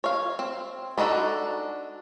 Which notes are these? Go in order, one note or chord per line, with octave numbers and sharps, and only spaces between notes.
C#5 F5
C4
B3 D4 D#4 F#4 A4